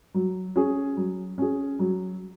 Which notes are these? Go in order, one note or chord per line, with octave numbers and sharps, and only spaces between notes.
F#3
C#4 G#4
F#3
C#4 G#4
F#3